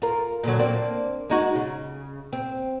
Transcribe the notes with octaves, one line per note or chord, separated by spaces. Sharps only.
F4 A#4
A#2 D3 F#3
A#3 C4 D4
G#3 D#4 F#4
C#3
C4